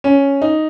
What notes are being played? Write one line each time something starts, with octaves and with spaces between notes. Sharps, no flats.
C#4
D#4